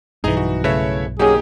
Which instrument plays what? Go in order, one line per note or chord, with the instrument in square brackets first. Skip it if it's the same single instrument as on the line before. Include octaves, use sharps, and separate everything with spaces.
[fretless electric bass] B1 G2 [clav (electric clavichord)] E3 D#4 [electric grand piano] G#4 G#5 A#5
[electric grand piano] F#4
[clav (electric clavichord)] C#3 A3 B4 [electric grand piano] E4 C#5 E5
[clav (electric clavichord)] F#3 C#4 [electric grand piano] A#3 D#4 G4 [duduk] G#4